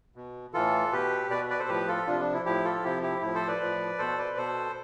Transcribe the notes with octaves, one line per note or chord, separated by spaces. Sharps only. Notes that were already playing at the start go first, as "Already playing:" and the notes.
B2
A2 E3 F4 A4
B2 G4 B4
B2 B4 D5
B4 D5
A4 C5
A2 F3 G4 B4
F4 A4
C3 F3 D4 F4
D4
E4
A2 F3 E4 G4
F4 A4
C3 F3 E4 G4
E4 G4
A2 F3 E4
A4 C5
B4 D5
A2 F3
B2 A4 C5
B4 D5
B2 A4 C5